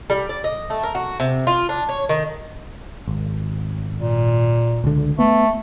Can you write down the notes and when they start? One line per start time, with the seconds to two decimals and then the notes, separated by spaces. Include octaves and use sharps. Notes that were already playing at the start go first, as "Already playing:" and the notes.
0.10 G3
0.29 D5
0.44 D#5
0.70 A3
0.83 A#4
0.95 F#4
1.20 C3
1.47 F4
1.69 D4
1.89 C#5
2.09 D#3
3.08 G#1
3.97 A#2
4.84 C#2 D3
5.19 A3 B3